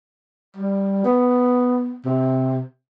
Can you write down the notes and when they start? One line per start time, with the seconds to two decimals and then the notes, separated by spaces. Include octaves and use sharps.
0.56 G3
1.04 B3
2.05 C3